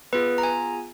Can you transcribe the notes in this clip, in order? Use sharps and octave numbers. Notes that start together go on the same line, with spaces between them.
B3 F4 G#4 B4
A#5
G#5